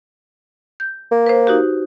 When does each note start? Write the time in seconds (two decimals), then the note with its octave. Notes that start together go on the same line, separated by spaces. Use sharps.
0.80 G6
1.11 A#3
1.26 B4 C5
1.47 D#4 F#4 G4